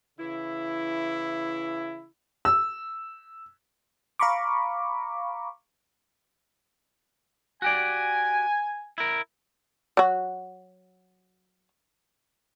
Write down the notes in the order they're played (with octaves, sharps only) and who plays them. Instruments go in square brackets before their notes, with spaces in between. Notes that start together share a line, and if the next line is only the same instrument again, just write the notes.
[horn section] C#3 E3 E4
[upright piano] E6
[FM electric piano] F5 A#5 B5 C#6 D6
[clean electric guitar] F#4 G4 D5 [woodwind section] G#5
[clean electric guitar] E4 A#4
[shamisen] F#3 F#4